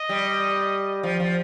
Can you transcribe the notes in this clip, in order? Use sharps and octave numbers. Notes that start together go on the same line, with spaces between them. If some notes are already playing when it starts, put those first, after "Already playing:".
Already playing: D#5
G3
F3
F3